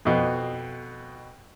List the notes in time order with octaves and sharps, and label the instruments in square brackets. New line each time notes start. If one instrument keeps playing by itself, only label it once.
[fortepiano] F2 B2